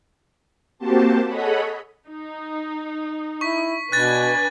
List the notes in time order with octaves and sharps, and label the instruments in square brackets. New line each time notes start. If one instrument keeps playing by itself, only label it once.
[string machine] A#3 C4 F#4 G4 C5 A5
G#4 A4 C#5 D#5 F#5 B5
[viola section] D#4
[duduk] E4 [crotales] C#6 B6
[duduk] B2 [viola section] D4 B4 G#5 [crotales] F#6 A6